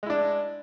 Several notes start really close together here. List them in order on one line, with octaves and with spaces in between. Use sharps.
G#3 E4 D4